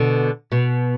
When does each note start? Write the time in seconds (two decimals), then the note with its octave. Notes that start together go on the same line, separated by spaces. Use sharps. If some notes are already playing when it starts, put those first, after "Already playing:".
Already playing: B2 D3
0.52 B2